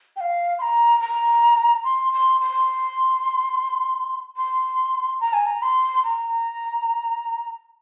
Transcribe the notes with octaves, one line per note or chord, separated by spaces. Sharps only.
G5
F5
C6
A#5
A#5
C6
C6
C6
C6
A#5
G#5
A#5
C6
A#5